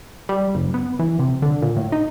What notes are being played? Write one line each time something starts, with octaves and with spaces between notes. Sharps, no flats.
G3
F#1
B3
E3
C3
D3
A#2
A2
D#4